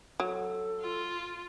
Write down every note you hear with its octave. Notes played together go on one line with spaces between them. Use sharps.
F#3 A4
F4